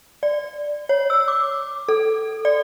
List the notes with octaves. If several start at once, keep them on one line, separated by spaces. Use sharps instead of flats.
D5
C#5
E6
D6
A4
D5